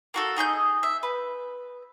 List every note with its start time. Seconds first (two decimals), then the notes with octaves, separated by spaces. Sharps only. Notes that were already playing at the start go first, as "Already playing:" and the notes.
0.14 A#3 F#4 A4
0.36 D#4 G#4 D#5 G6
0.83 E5
1.03 B4